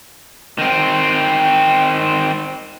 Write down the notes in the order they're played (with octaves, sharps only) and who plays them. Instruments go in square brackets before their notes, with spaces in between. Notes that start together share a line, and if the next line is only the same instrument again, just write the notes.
[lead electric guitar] D#3 C4